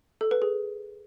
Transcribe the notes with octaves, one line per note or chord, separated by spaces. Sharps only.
A4
B4
G#4